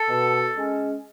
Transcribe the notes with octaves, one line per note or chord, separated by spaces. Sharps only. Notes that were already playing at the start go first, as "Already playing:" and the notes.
Already playing: A4
B2
G#3 C#4